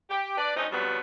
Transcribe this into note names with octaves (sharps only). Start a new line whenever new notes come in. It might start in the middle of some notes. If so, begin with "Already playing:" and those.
G4
D4 B4 D5
D2 C4 C#4 D#4
F2 C#3 F#3 G3 B3